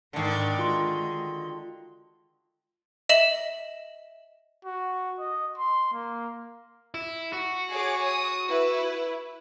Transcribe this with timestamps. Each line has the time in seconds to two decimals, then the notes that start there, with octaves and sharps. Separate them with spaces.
0.13 G#2 D3 D#3 D5 D6
0.59 G#3 F4 F#4 C6
3.09 D#5 E5 E7 F#7
4.65 F#4
5.19 D#5
5.58 C6
5.93 A#3
6.94 E4
7.33 F#4
7.72 G#4 C#5 D6
8.06 D#6
8.48 E4 B4